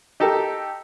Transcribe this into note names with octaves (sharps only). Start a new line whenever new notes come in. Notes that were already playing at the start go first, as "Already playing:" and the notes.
D#4 G4 A4 A#4 G5